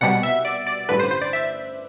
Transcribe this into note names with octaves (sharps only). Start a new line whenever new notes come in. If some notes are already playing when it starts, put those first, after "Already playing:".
C2 B2 G3 F#5
E5
D5
D5
A1 G2 D3 B4
C5
C5
D5
E5